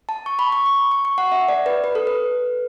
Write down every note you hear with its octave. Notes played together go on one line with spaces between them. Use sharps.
A5
C#6
B5
C#6
C#6
C#6
C#6
F#5
E5
D5
B4
B4
A4
B4